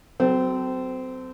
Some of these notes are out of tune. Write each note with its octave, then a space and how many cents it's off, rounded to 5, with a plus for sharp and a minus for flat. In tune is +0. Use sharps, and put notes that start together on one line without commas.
F#3 +25 C4 -25 A4 +0